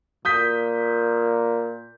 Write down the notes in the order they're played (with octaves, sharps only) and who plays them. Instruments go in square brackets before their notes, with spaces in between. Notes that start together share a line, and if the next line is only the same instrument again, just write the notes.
[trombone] A#2 [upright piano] D#6 G6 B6